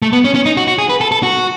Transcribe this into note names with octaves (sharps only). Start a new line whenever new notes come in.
A3
B3
C#4
C#4
D#4
F#4
F#4
G#4
B4
A4
A4
F#4